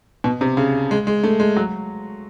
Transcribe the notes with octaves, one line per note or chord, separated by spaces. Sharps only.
B2
C3
C#3
G#3
G#3
A3
G#3
F#3